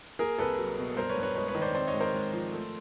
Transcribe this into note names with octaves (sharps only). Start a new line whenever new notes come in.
A#3 G#4 A#4
C2 A4 B4
F#3
B2
G2 A#4 C5
B4 C#5
G2
B4 C#5
G#3 B4 C#5
B4 C#5
D#3
C5 D5
C4 C5 D5
C#5 D#5
G#2
A#4 C5
G#3
F3
A3